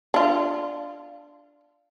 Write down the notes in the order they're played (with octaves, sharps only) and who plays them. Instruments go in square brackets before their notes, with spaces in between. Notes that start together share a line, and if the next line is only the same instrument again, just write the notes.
[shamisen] D4 F4